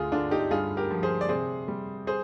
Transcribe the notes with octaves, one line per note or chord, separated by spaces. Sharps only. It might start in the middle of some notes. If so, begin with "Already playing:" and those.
Already playing: D2 F4 G#4
D3 D4 F4
D#4 G4
G2 F4 G#4
G4 A#4
F3
G#4 C5
D5
C3 G#4 C5
G3
G#4 C5